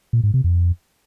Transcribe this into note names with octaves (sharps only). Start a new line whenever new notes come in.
A#2
G#2
C3
F2